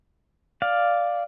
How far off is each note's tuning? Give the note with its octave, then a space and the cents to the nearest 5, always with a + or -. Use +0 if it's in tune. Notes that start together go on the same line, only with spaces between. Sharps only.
D5 +0 F5 +0